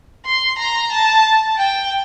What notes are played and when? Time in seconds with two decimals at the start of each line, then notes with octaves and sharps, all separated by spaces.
0.26 C6
0.58 A#5
0.92 A5
1.57 G5